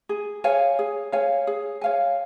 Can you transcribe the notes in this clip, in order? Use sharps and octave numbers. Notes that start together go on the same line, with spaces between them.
G#4
C#5 F5 G#5
G#4
C#5 F5 G#5
G#4
C#5 F5 G#5